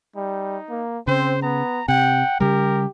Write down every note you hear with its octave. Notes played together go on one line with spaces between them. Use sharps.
G3 D#4
A#3
C#3 C4 C5
B3 A#5
C3 F#5 G5
C#3 G3 G4 A#4